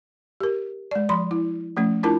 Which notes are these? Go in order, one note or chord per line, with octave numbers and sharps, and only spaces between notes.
G4 A#4
G#3 D5
F3 B5 C6
E4
F3 A3 C#4
D4 E4 F4 A#4 A5